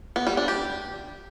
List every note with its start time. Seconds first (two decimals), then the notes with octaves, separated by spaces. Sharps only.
0.16 B3
0.27 G3
0.37 D4
0.48 G4